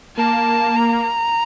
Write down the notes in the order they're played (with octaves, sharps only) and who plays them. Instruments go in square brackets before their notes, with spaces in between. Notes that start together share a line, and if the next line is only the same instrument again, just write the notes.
[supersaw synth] A#3 [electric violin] A5
[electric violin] A#5